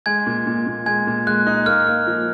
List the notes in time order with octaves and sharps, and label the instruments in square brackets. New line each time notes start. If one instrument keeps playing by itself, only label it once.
[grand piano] G#3 [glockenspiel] G#5 G#6
[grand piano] A#2
A#2
A#2
[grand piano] G#3 [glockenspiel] G#5 G#6
[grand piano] A#2
[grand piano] G#3 [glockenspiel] F#6
[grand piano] D#4
[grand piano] A#3 [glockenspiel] F6
[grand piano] A#3
F3